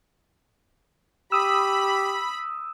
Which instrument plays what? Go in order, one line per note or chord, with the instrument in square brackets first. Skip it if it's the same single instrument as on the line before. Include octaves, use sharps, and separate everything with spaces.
[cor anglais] G4 [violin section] B5 [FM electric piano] D#6 E6